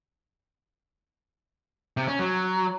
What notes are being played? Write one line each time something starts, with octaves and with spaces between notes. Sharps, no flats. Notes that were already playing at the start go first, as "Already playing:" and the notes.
C3
C#4
F#3